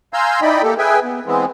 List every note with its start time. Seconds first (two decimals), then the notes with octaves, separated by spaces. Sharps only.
0.13 F5 G#5 A#5 C6 E6 G6
0.42 D#4 E4 D5 D#5 G5 B5
0.63 A#3 G4 A4
0.78 G#4 B4 E5 G5 G#5
1.03 B3
1.26 E3 G#3 B3 C4